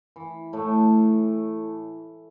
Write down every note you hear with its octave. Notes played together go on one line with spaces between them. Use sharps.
E3
A2 A3